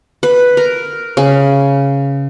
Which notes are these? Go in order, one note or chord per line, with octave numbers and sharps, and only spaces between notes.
B4
A#4
C#3